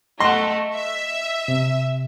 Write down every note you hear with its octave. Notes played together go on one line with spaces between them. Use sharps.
A3 D#5 F#5 C6
E5
C3